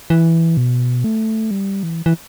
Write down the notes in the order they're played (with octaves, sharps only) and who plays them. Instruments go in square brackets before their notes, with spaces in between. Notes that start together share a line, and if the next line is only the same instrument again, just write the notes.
[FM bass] E3
B2
A3
G3
E3
E3